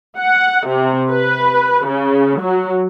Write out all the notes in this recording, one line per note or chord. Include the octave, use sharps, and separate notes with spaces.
F#5
C3
B4
C#3
F#3